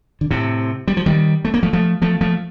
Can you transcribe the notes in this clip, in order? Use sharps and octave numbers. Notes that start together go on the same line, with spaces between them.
D3
A2 C3
G3
F3
D#3 G3
A3
A#3
F3 A3
F3 A3
F3 A3
F3 A3